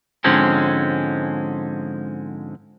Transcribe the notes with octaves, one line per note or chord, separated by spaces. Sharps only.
G#2 D3 F3 G#3 C4 C#4